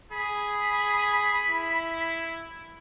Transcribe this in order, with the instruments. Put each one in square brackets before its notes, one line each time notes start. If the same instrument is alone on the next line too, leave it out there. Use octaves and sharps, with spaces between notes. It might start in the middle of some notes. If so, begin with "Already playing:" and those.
[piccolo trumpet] G#4 [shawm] B5
[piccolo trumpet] E4